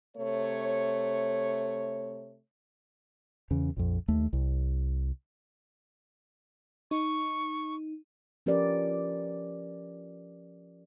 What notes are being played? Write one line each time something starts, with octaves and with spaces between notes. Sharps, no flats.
C3 A3 C#5
E2 C#3
A#1 F2
D#2 A3
C2
D#4 C#6
F3 C#4 G4 A#4 B4 D5